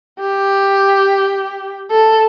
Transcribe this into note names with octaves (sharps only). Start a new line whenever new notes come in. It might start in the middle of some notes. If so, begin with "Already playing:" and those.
G4
A4